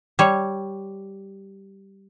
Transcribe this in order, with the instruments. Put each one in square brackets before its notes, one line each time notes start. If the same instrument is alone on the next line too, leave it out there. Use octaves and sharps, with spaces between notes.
[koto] G3 C#5